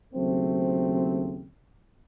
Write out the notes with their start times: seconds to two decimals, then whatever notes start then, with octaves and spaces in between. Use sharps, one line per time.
0.14 D#2 C#3 F#3 A3 C4